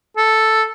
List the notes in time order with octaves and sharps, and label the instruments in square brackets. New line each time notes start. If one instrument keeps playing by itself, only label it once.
[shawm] A4